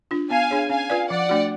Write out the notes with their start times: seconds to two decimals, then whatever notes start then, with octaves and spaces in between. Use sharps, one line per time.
0.11 D4 F4
0.30 B3 F5 G#5
0.51 D4 G#4 C#5
0.70 C#4 F5 G#5
0.90 F4 B4 D5
1.10 F3 D5 F#5
1.29 A3 D4 F#4